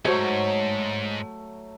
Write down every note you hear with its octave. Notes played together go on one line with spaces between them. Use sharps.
B1 G#2 F#3 A3 F#4 C5 C#5